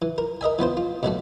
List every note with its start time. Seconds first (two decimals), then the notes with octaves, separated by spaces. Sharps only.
0.02 E3
0.18 A#4
0.41 A#4 D#5 E5 G#5
0.59 E3 B3 F4 C5
0.77 F4
1.03 B2 F#3 A3 F#4